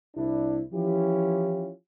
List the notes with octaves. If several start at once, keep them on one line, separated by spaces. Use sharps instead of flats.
C2 D4 E4
E3 F3 C#4 E4 F4 G4